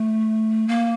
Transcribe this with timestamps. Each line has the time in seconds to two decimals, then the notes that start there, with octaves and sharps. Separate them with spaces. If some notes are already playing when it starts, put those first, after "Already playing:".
Already playing: A3
0.68 A#3